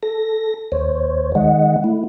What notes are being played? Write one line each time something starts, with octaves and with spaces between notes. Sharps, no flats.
A4 A#6
D#2 C5 C#5
D#3 G#3 D#5 F#5
A3 E4